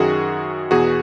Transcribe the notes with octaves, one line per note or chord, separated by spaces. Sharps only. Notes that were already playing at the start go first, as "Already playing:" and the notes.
Already playing: F#2 D#3 F#4 G#4
E2 B2 F#4 G#4